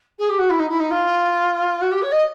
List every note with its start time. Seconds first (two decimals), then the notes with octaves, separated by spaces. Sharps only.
0.18 G#4
0.29 G4
0.38 F#4
0.49 E4
0.59 D#4
0.69 E4
0.79 D#4
0.90 F4
1.81 F#4
1.91 G4
2.02 C#5
2.11 D#5